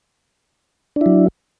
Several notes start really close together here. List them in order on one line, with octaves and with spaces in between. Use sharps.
D4 E4 F#3